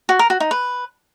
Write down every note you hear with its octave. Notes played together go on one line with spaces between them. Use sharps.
F#4
A#4
F#4
D#4
B4